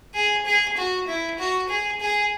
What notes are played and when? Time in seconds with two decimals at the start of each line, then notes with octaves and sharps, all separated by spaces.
0.15 G#4
0.46 G#4
0.77 F#4
1.07 E4
1.39 F#4
1.69 G#4
2.00 G#4